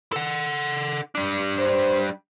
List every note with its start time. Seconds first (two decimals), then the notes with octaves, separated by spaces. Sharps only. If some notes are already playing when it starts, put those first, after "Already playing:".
0.12 A4 F#5
1.15 G3 D4
1.59 C5